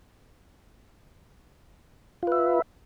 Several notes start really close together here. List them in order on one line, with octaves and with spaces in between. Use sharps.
F4 B4 E5